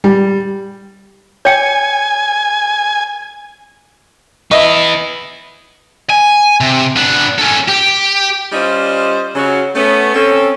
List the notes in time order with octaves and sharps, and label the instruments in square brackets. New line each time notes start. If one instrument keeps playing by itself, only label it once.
[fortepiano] G3
[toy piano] C#5 G5 [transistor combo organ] G#5
[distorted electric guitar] B3 E4 [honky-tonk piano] D#5 E5
[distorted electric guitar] G#5
C3
B3 D4
C#4 A4
G4
[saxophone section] G3 C#4 F4 C5 D5 D#5
C#3 F#3 C#4
A3 B3 C#4
C4 C#4 A4